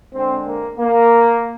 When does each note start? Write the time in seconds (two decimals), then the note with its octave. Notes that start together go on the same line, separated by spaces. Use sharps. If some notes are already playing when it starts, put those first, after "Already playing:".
0.14 D3 G#3 C4
0.46 A#3
0.78 A#3